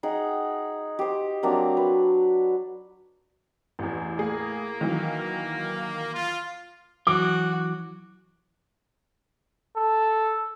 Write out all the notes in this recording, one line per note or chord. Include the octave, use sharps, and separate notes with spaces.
D#4 G#4 F#5 G5
G4 C5
F#3 A#3 C4 D4
B4
A1 E2
A2 A#3 G#4
D#3 E3 F#3
F4
E3 F#3 F#4 D6
A4